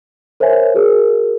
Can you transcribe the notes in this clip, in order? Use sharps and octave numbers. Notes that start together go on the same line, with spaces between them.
A#4 C5 C#5 E5 G#5
F#4 G#4 A#4